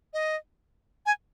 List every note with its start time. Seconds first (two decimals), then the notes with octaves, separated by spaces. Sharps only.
0.14 D#5
1.06 G#5